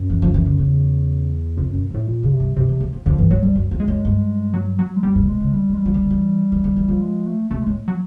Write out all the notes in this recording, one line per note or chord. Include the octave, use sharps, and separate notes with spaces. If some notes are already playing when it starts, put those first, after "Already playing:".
Already playing: F#2
E3
F3
E3
D3
E2 C#3
F2 C3
F#2 B2
F2 A2
F2 A#2
F#2 C#3
C3
G2
F#2 C3
E2
E2
F2
F2 D3
G2 E3
G#2 F#3
F2 G3
F#2
F2
G#3
F#2
G2
F#3
F#3
G#3
F#2 G3
G2
C3
B2 G#3
C#3
D#3 G3
E3 G#3
G3
F3
E3
D#3
E3
E3
D#3
E3
F3
G#3
A3
B2 A3
A2 G#3
F#3